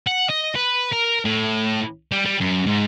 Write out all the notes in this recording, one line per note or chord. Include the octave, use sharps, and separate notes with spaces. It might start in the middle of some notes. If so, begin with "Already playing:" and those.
F#5
D#5
B4
A#4
A2
G3
G3
F#2
G#2